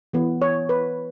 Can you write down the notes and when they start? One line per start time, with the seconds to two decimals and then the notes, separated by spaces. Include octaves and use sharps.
0.13 E3 B3
0.42 C#5
0.69 B4